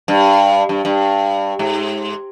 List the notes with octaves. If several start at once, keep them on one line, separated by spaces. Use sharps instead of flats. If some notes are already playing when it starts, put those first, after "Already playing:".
G2
G2
G2
G#2